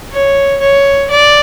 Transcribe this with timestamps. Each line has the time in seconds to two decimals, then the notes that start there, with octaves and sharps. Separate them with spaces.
0.12 C#5
0.61 C#5
1.10 D5